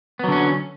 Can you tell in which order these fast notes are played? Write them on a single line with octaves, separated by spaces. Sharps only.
B3 F#3 D3 C#4